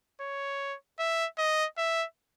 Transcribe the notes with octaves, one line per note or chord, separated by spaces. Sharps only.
C#5
E5
D#5
E5